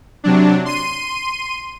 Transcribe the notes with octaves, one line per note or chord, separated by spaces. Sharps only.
C3 F#3 D4
C6 D#7